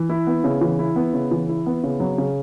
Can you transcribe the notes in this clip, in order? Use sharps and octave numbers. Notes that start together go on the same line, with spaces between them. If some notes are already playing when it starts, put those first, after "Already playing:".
Already playing: E3
E4
B3
C#3
E3
E4
B3
C#3
E3
E4
B3
C#3
F#3
C#3